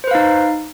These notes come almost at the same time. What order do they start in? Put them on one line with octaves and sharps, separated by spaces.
C5 B4 F5 D#4